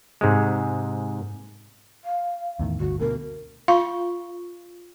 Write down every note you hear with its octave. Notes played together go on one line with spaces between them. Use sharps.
G#2 C3 G#3
F5
E2 A2 D#3
G1 D2 F#4
D2 B2 A#4
F4 F5 C#6